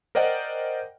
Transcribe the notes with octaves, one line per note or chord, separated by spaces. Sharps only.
A#4 C5 D5 D#5 F#5 G5